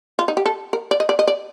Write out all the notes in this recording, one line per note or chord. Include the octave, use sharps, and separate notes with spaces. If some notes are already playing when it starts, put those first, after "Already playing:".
F4
D#4
G4
A4
A#4
D5
D#5
D5
D#5
D5